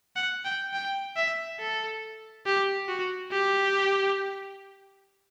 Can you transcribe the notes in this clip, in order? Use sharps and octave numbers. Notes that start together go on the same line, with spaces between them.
F#5
G5
G5
E5
A4
G4
F#4
G4